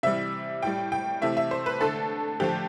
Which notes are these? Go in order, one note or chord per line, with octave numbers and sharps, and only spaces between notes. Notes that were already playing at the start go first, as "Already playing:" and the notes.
C3 E3 G3 E5
A2 G3 G5
G5
C3 E3 A3 E5
E5
C5
B4
D3 A3 A4
D3 F3 A3 G4